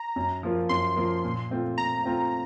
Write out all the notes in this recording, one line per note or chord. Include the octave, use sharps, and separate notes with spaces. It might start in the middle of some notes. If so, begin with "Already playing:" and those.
Already playing: A#5
F#2
F3 A#3 F4 A#4
F#2 C6
F3 A#3 F4 A#4
A#2
A3 C4 F4
A#2 A#5
A3 C4 F4